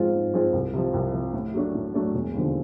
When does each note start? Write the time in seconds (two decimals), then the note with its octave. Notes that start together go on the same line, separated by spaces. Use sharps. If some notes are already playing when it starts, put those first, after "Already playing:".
Already playing: G#2 F3 G#3 C4 F4
0.13 G#2
0.34 F3 G#3 C4 F4
0.53 C2
0.73 C3 F3
0.93 C2
1.13 C3 F3
1.33 A2
1.54 F#3 A3 D4
1.74 A2
1.94 F#3 A3 D4
2.14 E1
2.33 D#2 D3 F3